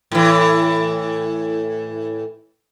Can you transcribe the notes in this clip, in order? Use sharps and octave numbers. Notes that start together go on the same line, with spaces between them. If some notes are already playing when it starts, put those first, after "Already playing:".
A2 E3